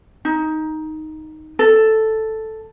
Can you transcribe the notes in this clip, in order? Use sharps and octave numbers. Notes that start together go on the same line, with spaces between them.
D#4
A4